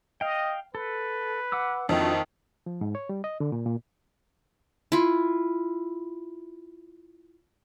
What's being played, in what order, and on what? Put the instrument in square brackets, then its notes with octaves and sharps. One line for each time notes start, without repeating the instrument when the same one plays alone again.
[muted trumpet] D#5 [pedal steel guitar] F5 G5
[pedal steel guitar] A4 [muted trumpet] B4
[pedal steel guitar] F#5 D6 E6
[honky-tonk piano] F2 [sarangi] D#3 [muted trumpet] A3 [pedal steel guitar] D4 F4 F#4
[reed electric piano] F3
G#2
C#5
G3
D#5
D3
A#2
A#2
[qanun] E4 F4